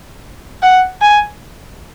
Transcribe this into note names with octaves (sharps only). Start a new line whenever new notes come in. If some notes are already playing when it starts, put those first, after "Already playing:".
F#5
G#5